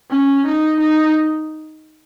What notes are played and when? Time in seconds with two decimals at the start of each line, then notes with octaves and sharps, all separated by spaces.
0.11 C#4
0.46 D#4
0.80 D#4